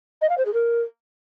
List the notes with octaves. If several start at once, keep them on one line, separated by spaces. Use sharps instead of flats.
D#5
F5
C5
G#4
A#4